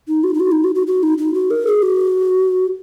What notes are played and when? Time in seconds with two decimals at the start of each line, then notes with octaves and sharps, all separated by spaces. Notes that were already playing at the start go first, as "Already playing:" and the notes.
0.08 D#4
0.24 F#4
0.34 D#4
0.40 F#4
0.52 D#4
0.64 F#4
0.75 F#4
0.87 F#4
1.03 D#4
1.18 D#4
1.34 F#4
1.51 A#4
1.67 G#4
1.82 F#4